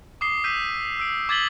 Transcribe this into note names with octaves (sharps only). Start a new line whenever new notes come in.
D6 D#6 C7 G7
E6 G6 B6 D#7
E6 D7
D6 G#6 A6 B6 F#7 G7